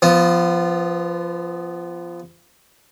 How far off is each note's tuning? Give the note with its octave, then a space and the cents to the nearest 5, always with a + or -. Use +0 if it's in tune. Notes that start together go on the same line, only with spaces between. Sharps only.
F3 -15 B3 +15